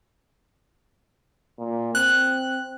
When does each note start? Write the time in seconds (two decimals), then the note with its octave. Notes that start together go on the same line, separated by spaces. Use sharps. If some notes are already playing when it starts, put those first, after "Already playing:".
1.59 A#2
1.95 C4 F#6